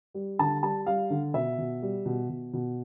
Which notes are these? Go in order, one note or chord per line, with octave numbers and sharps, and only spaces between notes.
G3
D3 A5
G3 A5
G3 F5
D3
B2 E5
B2
G3
B2
B2
B2